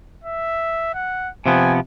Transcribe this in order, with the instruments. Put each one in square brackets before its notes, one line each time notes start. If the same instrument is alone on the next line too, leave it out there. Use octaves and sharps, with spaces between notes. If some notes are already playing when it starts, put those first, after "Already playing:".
[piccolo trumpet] E5
F#5
[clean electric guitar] C3 F3 B3 [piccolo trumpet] G#5